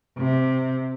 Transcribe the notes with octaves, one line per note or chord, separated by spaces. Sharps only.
C3